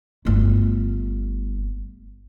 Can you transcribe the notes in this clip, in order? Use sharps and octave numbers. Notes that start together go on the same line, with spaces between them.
G1 A3